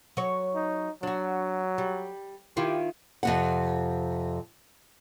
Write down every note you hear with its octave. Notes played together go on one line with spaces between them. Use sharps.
F#3 C#5
D#4
F#3 D4 F#4
G3
D#3 E4 F4 G4
F2 C3 F#5